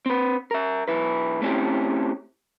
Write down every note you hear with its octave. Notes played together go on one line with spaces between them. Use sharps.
C4 B4
A#4 E5
B1 E4 B4
A3 C4 C#4 E4 G4